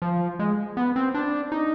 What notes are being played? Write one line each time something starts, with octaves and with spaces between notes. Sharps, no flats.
F3
G#3
B3
C4
D4
D#4